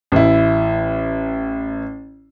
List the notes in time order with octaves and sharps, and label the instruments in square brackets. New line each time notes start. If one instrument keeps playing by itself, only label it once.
[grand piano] A1 E4